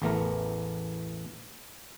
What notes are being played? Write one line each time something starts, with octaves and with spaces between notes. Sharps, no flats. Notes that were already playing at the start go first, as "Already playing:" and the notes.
A1 E2 E3 A3 B3 A#4